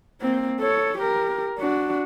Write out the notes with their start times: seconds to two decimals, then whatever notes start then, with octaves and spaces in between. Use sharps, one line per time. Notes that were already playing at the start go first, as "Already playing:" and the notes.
0.21 A#3 C4
0.60 A4 C#5
0.98 G4 A#4
1.58 D4 F#4